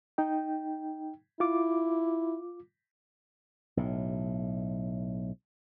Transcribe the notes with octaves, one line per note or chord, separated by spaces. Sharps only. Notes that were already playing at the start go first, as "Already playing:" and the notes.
D#4 G5
E4 F4 D6
B1 A2